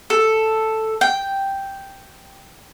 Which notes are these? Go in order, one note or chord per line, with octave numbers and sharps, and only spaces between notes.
A4
G5